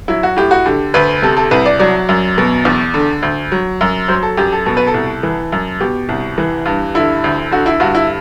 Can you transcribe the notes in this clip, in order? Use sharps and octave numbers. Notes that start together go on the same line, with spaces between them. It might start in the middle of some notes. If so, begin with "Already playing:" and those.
F#3 E4
F#4
A2 G4
F#4
D3 G4
D2 B4
C3 A4
A4
C2 B4
D5
F#3 D5
F#2
B2
E2
D3
D2
F#3
F#2
F#3 C5
A4
F#2 G4
A4
B2 A4
B4
A4
C2
E3
F#2
B2 G4
C2
E3
G2
D3 E4
D2
D3 F#4
E4
G2 F#4
E4